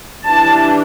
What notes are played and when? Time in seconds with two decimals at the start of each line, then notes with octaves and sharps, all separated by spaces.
0.25 E3 G3 D4 A5